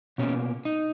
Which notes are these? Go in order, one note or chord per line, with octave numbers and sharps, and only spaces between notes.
B2 A#3 C#4
D#4